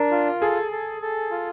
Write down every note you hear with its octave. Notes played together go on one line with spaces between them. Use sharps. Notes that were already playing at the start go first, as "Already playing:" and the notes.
Already playing: D4 A#4
F4
G#4 A4
A4
A4
F4